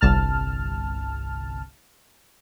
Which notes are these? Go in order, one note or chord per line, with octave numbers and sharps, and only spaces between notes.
G1 C2 A5 F6